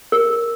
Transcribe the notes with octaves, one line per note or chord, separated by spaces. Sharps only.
A#4